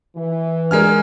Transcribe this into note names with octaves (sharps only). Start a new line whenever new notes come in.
E3
G#3 D4 A#4 D5 G#5 F6